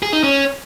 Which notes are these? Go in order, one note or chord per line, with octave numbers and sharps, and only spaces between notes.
G#4
D#4
C#4